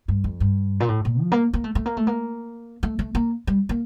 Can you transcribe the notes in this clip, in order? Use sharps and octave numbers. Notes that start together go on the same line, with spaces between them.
G2
F2
G2
A#2
A2
A#2
F3
A#3
A#3
A3
A3
A#3
A3
A#3
A3
A3
A#3
G3
A#3